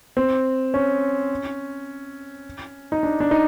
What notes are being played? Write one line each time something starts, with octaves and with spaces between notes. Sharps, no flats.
C4
C#4
D#4
D4
D4
D#4